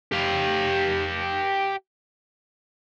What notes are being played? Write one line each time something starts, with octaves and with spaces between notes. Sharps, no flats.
G4 F5